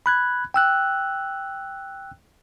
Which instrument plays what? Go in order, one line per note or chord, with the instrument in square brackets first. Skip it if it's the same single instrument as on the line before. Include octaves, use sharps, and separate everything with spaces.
[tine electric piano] B5 F#6 G#6
G5 E6 F#6